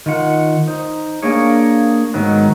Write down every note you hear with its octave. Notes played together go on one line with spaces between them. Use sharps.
D#3 F4 F#5
D#4 C5
A#3 D4 G#4 C#5
G#2 D#3 F#3 B3